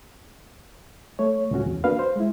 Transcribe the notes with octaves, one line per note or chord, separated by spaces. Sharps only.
A3 C#5
C#2 A2 C#3 C#4 F#4
E2
A#3 D4 F#4 B4 F5
C5
G#3 E4